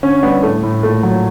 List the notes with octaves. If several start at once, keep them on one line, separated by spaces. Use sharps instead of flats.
D3 C#4
G3 B3
A2 A3
A2
A#2 A3
F#3